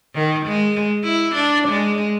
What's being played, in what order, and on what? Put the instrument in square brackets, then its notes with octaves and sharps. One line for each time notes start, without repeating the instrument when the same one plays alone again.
[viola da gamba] D#3
G#3
E4
D4
G#3